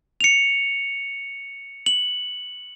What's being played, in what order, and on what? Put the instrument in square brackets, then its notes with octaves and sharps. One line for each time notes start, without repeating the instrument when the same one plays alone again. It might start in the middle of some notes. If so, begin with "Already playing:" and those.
[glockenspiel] C#7 F7
F#7